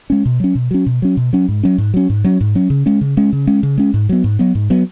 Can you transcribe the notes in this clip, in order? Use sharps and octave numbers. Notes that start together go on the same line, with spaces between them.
G#3 C#4
B2
F#3 C#4
B2
F#3 C#4
B2
F#3 C#4
B2
F#3 C#4
G#2
F#3 C#4
G#2
F#3 C#4
G#2
F#3 C#4
G#2
F#3 C#4
C#3
G#3 C#4
C#3
G#3 C#4
C#3
G#3 C#4
C#3
G#3 C#4
G#2
F#3 B3
G#2
F#3 B3
G#2
F#3 B3